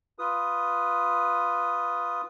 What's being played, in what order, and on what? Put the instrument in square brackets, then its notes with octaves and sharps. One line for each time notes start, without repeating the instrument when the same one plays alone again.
[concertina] F4 B4 D#6